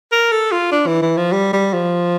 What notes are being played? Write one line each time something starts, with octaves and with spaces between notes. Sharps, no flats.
A#4
A4
F4
D4
E3
E3
F3
G3
G3
F3